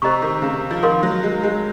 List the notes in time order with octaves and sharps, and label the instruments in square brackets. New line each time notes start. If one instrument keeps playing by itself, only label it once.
[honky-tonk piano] C3 [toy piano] C5 D#5 A#5 C#6
[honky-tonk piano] D#3
C#3
F3
[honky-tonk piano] D#3 [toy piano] A#4 F5 C6
[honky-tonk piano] F#3
G#3
G#3